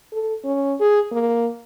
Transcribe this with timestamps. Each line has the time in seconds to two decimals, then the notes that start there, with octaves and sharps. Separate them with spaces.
0.12 A4
0.44 C#4
0.80 G#4
1.12 A#3